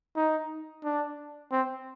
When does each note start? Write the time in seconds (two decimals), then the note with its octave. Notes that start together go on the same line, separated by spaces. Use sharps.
0.16 D#4
0.84 D4
1.52 C4